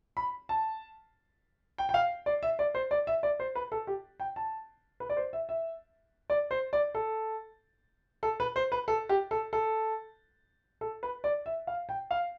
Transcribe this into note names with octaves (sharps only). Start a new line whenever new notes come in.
B5
A5
G5
G5
F5
D5
E5
D5
C5
D5
E5
D5
C5
B4
A4
G4
G5
A5
B4
D5
C5
E5
E5
D5
C5
D5
A4
A4
B4
C5
B4
A4
G4
A4
A4
A4
B4
D5
E5
F5
G5
F5